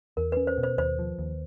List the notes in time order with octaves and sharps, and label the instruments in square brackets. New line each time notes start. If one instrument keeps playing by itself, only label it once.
[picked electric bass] E2 [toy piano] A#4
[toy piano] B4
[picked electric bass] C#4
[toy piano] C5
[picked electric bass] B2
[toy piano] C5
[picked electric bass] D#2 [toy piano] C5
[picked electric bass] F3
D#2